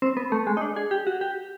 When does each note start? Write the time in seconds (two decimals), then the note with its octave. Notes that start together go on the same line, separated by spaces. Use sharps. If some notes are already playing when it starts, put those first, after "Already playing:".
0.02 C4
0.17 B3
0.32 A3
0.47 G#3
0.57 D#4
0.61 D4
0.76 G#4
0.91 G4
1.07 F#4
1.21 G4